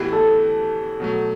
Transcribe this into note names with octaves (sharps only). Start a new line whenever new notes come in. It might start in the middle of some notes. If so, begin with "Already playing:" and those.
Already playing: A2 E3 B3 E4 G4
A4
B2 F#3 A3